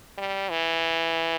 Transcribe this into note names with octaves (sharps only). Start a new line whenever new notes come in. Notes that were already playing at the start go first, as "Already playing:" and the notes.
G3
E3